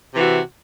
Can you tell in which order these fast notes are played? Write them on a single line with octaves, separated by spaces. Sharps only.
C3 E3 F#4